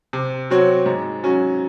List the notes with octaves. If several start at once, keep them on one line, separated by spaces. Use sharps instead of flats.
C3
F#3 C4 F#4 C#5
G#2
F#3 C#4 F#4